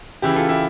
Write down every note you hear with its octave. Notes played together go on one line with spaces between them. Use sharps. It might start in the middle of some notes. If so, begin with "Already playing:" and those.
C#3 E3 E4 G4
F4 A4
E4 G4